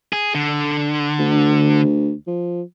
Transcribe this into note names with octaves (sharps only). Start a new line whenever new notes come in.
G#4
D3
D2
F3